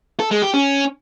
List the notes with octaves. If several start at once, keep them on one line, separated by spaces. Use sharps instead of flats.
A4
G#3
G4
C#4